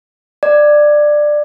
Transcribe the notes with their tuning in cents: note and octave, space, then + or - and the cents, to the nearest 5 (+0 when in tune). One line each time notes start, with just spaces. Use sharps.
D5 +15